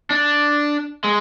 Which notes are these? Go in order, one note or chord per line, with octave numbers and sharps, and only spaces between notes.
D4
G#3